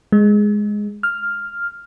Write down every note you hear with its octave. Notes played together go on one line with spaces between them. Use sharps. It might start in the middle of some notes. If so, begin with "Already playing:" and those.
G#3
F6